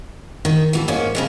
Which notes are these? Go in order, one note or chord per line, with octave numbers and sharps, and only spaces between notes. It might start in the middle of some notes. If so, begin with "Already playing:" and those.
D#3
E3 F#4 A4
G#2 A#3 C#4
C#3 F3 G#3